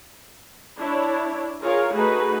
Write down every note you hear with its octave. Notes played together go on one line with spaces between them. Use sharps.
D4 E4 C#5
F4 G#4 A#4 C#5 F5
A3 D#4 F#4 G#4 B4